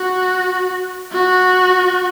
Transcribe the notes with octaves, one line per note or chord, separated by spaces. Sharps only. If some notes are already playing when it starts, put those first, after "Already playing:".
Already playing: F#4
F#4